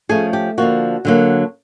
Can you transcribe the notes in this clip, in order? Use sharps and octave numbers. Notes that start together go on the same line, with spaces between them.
F3 A3 C#4 G#4
G4
D3 F3 A#3 F#4
D3 F#3 A#3